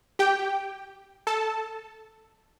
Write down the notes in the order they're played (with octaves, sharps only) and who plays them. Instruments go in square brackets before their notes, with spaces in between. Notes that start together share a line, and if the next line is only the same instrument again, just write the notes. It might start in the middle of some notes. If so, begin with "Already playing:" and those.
[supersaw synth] G4 G5
A4 A5